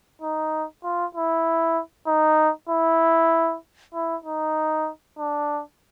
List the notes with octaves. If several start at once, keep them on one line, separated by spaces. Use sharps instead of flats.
D#4
F4
E4
D#4
E4
E4
D#4
D4